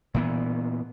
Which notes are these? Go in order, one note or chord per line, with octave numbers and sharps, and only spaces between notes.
A#2 E3 B3